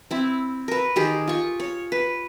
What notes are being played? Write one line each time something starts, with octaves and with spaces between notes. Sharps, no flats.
C4 E4
A#4 B4
D#3 G4 G#4 C5
F4 C#6
C#5
B4